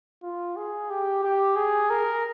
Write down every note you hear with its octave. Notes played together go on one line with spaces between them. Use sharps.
F4
G#4
G4
G4
G#4
A#4